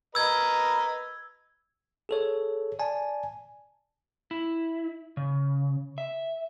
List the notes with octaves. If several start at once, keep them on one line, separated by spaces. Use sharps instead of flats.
A#4 B4 D#5 E6 G#6
G#4 A4 C#5
D5 G#5 A5
E4
C#3
E5